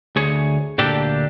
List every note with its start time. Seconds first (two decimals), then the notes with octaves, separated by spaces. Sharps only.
0.16 D2 G#4 C#5
0.78 D2 A#2 D4 G4 A4 G5